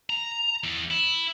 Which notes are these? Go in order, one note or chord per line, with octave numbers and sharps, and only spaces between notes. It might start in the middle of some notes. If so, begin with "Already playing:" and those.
A#5
E2
E4